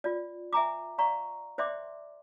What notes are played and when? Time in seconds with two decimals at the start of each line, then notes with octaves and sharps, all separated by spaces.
0.04 F4 D5
0.53 E5 G#5 A#5 D6
0.98 D5 F5 A#5 C#6
1.58 C5 D5 E5 G5 C6 D6